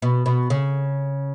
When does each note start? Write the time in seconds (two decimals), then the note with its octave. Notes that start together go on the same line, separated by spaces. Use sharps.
0.02 B2
0.26 B2
0.50 C#3